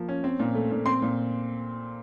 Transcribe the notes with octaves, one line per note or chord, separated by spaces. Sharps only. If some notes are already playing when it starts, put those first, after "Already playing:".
Already playing: F3 A#3
C#4
C4
A#2
A3
A#2
C4 C6
A#2